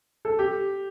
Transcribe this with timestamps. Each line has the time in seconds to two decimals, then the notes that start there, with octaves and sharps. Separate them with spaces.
0.25 A4
0.39 G4